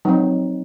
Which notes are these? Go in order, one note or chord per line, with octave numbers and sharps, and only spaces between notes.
F#3 C4 D#4